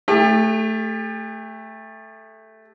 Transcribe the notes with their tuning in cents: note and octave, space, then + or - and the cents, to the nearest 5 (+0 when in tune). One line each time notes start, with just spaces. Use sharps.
A3 +0 G4 +40